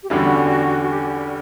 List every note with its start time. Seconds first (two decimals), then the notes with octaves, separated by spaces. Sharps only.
0.03 G4
0.10 E2 D3 G3 C#4 F#4
0.81 F#4
0.89 G4